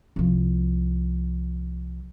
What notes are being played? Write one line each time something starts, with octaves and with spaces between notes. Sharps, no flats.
C2 F3